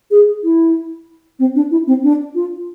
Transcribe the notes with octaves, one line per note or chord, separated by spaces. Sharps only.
G#4
E4
C4
D4
E4
C4
D4
F4